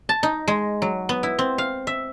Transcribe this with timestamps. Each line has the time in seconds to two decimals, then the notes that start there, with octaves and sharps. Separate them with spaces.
0.09 A5
0.23 D#4
0.48 G#3
0.82 F#3
1.09 B3
1.23 E4
1.39 C4
1.58 F5
1.87 E5